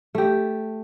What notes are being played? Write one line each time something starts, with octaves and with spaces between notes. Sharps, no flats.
A3 G4